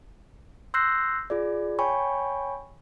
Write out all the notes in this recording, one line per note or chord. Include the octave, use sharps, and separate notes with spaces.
C6 E6 F#6 G6 A#6 C7
F4 G#4 D5
C#5 G5 G#5 B5 C#6